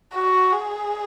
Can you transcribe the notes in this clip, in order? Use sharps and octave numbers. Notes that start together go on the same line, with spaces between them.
F#4
G#4